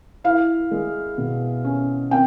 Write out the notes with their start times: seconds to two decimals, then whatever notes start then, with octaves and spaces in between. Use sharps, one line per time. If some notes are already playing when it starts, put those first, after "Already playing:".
0.24 E4 F5
0.71 G#3
1.18 B2
1.65 C#4
2.11 C4 G5